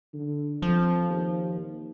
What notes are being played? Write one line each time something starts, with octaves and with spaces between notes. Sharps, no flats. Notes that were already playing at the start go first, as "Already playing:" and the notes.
D3
F2 F3
D#2